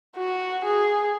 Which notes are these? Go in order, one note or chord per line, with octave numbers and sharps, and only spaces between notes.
F#4
G#4